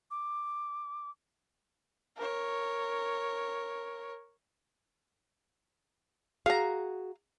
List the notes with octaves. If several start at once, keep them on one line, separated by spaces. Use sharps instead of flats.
D6
A#4 C#5
F#4 G#4 F5 A#5